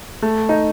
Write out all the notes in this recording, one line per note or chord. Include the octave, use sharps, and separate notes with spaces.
A3
D#4